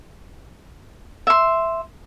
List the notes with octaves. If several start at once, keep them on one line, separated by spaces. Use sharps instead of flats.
E5 C6